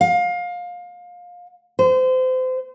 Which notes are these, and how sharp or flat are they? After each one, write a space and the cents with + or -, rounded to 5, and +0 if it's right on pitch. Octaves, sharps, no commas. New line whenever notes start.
F5 +25
C5 -30